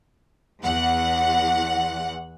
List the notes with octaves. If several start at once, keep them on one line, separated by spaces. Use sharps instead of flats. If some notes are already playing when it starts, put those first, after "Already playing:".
E2 F#5